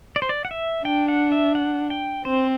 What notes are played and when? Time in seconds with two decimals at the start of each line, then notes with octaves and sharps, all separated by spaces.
0.16 D5
0.22 C5
0.29 D5
0.45 F#5
0.51 E5
0.85 D4 G5
1.08 F#5
1.32 E5
1.55 F#5
1.90 G5
2.25 C4 C5